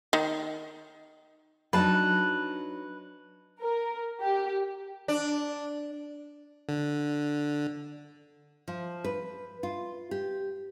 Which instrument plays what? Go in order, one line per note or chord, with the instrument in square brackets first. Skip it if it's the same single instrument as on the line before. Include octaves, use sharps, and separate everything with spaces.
[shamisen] D#3
[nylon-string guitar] F#3 D4 D#4 [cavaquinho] B4 A5
[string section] A#4
G4
[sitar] D4
[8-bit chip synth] D3
[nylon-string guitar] F3
B4
F4
G4